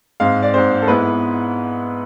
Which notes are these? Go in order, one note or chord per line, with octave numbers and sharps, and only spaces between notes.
G#2 G#3 C4 F5
D5
G#2 G#3 C4 C5
A4
G#2 G#3 B3 E4 B4